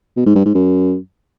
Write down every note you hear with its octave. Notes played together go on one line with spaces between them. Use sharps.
B2
G#2
G2
G#2
F#2